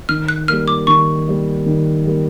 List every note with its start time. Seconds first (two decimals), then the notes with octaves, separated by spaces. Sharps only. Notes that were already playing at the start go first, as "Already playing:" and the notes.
0.09 D#3 F6
0.28 F#6
0.48 G3 A#3 F6
0.68 D6
0.87 D#3 C#6
1.27 G3 A#3
1.66 D#3
2.06 G3 A#3